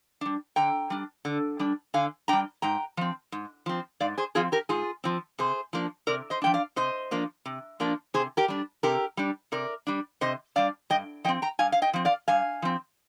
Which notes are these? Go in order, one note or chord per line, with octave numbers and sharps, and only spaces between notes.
G3 D4
D3 G5 A#5
G3 D4
D3
G3 D4
D3 F5 G#5
G3 D4 G5 A#5
G#2 G5 A#5
F3 C4
G#2
F3 C4
G#2 D5 F5
G#4 C5
F3 C4 F4 G#4
G4 A#4
G#2 F4 G#4
F3 C4
C3 G#4 C5
F3 A#3 D4
C3 A#4 D5
C5 D#5
F3 A#3 D4 G5
D5 F5
C3 C5 D#5
F3 A#3 D4
C3
F3 A#3 D4
C3 G#4 C5
G4 A#4
G3 D4
C3 G4 A#4
G3 D4
C3 A#4 D5
G3 D4
C3 C5 D#5
G3 D4 D5 F5
G2 D#5 G5
F3 C4 D#5 G5
G5 A#5
G2 F5 G#5
F5
D#5 G5
F3 C4
D5 F5
G2 F5 G#5
F3 C4